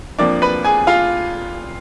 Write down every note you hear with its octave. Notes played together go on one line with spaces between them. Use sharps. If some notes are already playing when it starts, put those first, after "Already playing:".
F2 F3 A#3 D4 D5 D6
B4 B5
G#4 G#5
F4 F5